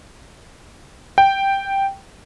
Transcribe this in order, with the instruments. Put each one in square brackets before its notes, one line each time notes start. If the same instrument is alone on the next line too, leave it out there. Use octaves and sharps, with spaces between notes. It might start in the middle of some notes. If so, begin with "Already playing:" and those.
[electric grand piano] G5